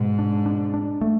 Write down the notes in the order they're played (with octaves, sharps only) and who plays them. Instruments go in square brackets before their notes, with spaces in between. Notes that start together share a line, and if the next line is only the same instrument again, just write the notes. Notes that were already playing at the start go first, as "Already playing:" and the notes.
Already playing: [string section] G#2 [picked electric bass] B2
[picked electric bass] D4
D4
D4
A3